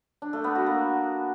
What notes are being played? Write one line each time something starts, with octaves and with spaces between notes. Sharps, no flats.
D4
A3
B3
F#4
A#3